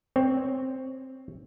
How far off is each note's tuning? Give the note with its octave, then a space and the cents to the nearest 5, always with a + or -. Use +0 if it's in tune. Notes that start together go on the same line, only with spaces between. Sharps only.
C4 +5 C#5 +0